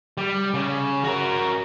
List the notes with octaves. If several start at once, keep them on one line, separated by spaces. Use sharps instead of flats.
G3
C#3
F#4 A#4